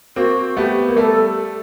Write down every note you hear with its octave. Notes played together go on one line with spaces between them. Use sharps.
A#3 C4 F#4
A3 B3 G4
A#3
G3 A3 A4 A#4